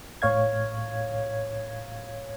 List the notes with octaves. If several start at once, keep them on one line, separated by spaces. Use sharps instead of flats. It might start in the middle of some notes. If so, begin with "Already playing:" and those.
A2 C#5 F5 G#6